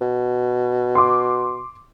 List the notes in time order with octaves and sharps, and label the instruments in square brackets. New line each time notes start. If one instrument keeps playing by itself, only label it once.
[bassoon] B2
[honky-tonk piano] C6 D6